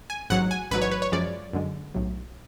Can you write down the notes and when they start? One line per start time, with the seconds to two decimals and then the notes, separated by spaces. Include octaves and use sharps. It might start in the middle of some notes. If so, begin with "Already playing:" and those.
0.10 G#5
0.30 A1 G#2 F#3 F#5
0.51 G#5
0.71 A1 G#2 F#3 B4
0.82 C#5
0.92 B4
1.02 C#5
1.12 F#2 F3 G#3 D5
1.53 F#2 D3 G#3
1.95 B1 A2 F#3